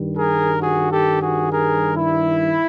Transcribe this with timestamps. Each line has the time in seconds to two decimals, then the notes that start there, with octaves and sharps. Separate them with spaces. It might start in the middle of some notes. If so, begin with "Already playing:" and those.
Already playing: G2 D#3 G3
0.15 G#4 A#4
0.61 F#4 G#4
0.91 G4 A4
1.21 F#4 G#4
1.52 G#4 A#4
1.97 E4